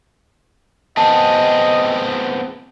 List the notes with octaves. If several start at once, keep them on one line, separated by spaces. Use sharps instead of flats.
B3 C4 G#4 D#5 A5